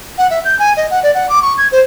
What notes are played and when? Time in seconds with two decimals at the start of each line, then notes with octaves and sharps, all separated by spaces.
0.18 F#5
0.30 E5
0.45 G6
0.59 G#5
0.77 D#5
0.91 F#5
1.03 D5
1.15 F#5
1.29 D6
1.42 C#6
1.58 G#6
1.72 C5